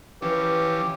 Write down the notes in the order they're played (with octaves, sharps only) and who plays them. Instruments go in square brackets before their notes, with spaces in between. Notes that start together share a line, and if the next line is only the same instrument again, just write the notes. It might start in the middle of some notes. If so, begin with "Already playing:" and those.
[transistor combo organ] E3 F3 C#4 [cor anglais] G4 [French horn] B4